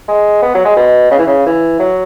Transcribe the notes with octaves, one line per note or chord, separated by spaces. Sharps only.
G#3
B3
F#3
G#3
B2
C#3
E3
C#3
E3
F#3